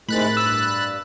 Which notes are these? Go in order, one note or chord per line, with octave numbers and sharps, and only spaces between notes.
A2 C3 D#3 G#3 B5 F#6 A6
G2 E6